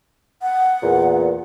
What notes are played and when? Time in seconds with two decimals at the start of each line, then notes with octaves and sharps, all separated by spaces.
0.42 F#5
0.82 E2 A#2